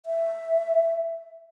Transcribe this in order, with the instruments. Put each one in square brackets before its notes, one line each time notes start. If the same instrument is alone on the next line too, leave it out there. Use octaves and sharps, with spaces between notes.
[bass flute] E5